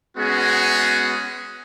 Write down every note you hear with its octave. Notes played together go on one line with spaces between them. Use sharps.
G#3 B3 C#4 F#4 G#4